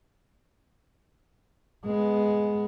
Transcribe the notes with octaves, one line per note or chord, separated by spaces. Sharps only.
G#3 B3